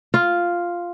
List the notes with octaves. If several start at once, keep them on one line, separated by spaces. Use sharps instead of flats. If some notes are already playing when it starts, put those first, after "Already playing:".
F4